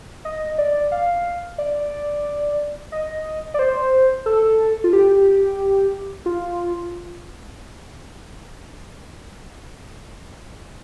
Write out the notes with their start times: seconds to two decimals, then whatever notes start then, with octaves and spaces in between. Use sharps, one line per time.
0.25 D#5
0.58 D5
0.92 F5
1.58 D5
2.92 D#5
3.54 D5
3.59 C5
4.26 A4
4.84 F4
4.93 G4
6.26 F4